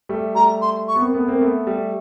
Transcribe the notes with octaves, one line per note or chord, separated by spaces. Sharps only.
G3 A3
G3 A3 A#5
C6
C#6
B3
A#3 C4
A3 B3
A#3 C4
A3 B3
G3 A3